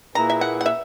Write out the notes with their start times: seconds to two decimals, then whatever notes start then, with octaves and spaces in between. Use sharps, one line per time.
0.15 A#2 A#3 E4 G#4 B4 A#5
0.30 E5
0.41 F#5
0.61 F#5
0.66 E5